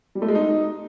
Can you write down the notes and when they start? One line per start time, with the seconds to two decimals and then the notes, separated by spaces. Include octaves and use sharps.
0.15 G3
0.22 A3
0.28 G#3
0.35 D#4